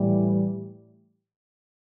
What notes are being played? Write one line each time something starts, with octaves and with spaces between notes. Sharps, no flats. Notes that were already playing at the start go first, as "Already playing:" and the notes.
Already playing: A2 E3 G3